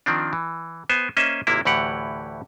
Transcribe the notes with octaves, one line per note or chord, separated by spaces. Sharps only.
D#3 F3 C4 D4
E3
B3 C5 G#5
A#3 C#4 C5 D#5 E5
G#1 C3 A#3 E4
D2 A2 E3 G4 F#5